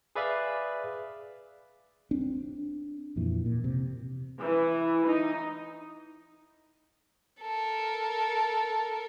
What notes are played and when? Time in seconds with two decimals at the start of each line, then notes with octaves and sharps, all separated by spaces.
0.16 G#4 B4 D5 E5 F5
2.11 C4 D4
3.16 F2 A#2 E3
3.46 A#2
3.64 C3
4.40 E3
5.07 D#4
7.41 A4 A#4